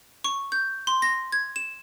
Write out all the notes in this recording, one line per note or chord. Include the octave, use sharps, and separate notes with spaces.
C#6
G6
C6
A#6
G#6
E7